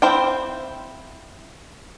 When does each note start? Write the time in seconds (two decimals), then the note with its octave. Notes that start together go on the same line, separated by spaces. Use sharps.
0.02 C4 E4 C5 F5 G5